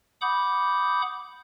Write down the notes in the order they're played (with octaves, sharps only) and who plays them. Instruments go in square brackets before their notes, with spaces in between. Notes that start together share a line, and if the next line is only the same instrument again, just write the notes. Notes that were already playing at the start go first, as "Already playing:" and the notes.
[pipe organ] F#5 B5 D6 D#6 G6